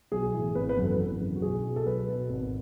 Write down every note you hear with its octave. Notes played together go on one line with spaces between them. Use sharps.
B1 G#4
A2 E3
G#1 B4
B4
F#2 C#3 E3
A4
G#1
F#2 C#3 E3
F#4
B1 G#4
B2
A4
B1 B4
B2
G#1